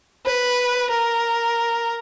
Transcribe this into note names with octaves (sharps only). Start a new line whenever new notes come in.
B4
A#4